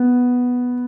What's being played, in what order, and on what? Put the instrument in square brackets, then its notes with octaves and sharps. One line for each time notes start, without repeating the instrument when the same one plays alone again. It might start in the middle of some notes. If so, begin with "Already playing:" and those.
Already playing: [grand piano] B3